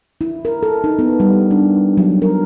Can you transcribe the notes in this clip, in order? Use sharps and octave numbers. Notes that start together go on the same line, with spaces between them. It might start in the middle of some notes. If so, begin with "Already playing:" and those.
E4
A#4
A4
D#4
B3
G3
D4
F#3
A#4